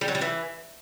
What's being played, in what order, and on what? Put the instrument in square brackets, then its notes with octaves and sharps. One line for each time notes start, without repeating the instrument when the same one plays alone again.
[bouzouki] G3
F#3
G3
E3